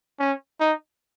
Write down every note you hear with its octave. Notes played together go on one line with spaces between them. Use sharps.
C#4
D#4